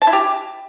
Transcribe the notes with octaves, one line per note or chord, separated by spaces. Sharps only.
A5
E4
G4